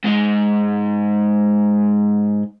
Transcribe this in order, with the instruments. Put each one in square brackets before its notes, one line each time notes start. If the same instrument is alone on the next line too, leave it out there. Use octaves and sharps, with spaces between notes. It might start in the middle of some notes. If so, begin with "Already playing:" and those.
[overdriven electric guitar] G#2 G#3